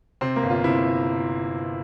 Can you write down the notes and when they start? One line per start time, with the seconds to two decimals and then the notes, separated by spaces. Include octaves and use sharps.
0.21 C3 C4
0.36 A#3
0.43 G1
0.50 F4
0.64 C3 E4